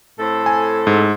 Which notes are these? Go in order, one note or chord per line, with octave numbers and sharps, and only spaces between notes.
A2 C4 A4
G#5
G#2